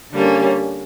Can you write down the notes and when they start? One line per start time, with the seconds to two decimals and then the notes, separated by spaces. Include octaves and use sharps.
0.12 D3 G3 A#3 C#4